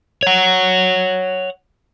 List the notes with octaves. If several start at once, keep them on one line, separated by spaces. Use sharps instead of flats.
C#5 F#5